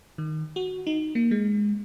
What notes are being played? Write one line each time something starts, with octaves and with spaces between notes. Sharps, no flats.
D#3
F#4
D#4
A#3
G#3